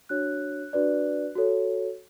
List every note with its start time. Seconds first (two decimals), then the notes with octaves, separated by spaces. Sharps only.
0.09 D4 F#4 C#5 F#6
0.73 D4 F#4 B4 D5
1.35 F#4 A4 C#5